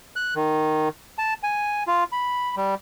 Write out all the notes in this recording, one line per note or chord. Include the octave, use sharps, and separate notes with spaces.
F#6
D#3
A5
G#5
F4
B5
G3